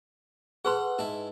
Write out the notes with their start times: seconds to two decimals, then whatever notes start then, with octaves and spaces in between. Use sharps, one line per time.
0.65 G#4 A4 B4 F#5 C6
0.98 G#2 E4 A5